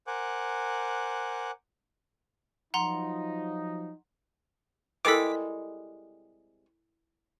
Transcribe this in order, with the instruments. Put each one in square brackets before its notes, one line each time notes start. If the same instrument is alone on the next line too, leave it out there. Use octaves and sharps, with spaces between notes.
[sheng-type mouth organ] A#4 C5 F#5 G#5 D6 F#6
[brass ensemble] F3 F#3 D#4 [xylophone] F#5 A#5 C6
[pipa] C3 G3 G#3 [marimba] E4 A4 A#4 [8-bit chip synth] D6 B6